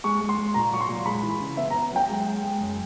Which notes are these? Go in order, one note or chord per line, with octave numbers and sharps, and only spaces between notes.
G#3 C#6
G#3
C6
G#3
A#2 A#5
F#3 C#6
C6
A#2
G#3 B5
E3
C#3
B3 E5
A#5
B3
F#3 G5
G#3
G#3
G#3
F#2